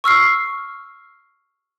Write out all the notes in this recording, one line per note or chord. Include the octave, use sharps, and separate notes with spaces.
C#6 E6 F6 C7